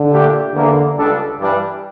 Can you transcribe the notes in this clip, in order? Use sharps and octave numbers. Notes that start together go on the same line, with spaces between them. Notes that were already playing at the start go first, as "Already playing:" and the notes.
Already playing: D3
A#2 A3 D4 G4
E2 D3 E3 A#3
C#2 C#3 G3 D4 A4
G2 E3 G3 D4